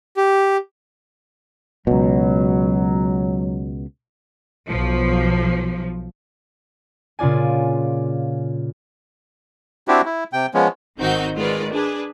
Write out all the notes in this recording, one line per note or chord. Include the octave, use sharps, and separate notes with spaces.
G4
C#2 B2 F#3
B1 F3
A#2 C#3 F4 D5 G#5
C4 D4 E4 F#4 G4
E4
C3 G5
F3 G#3 B3 C#4
G#1 D#3 C4 D#4 F#4 G6
D#3 G#3 F4 B4 D5
D4 G#4 B4